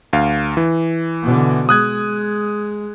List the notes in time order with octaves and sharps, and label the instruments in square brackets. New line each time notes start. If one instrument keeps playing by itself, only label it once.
[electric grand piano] D2 F5
E3
[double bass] B2 D3
[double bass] G#3 [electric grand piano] D#6 F#6 G#6